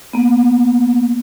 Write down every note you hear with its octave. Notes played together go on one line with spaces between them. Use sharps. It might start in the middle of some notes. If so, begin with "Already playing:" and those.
A#3 B3